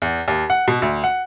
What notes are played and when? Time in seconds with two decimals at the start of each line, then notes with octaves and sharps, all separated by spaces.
0.02 E2
0.28 D#2
0.50 F#5
0.68 B2
0.82 D2
1.04 F#5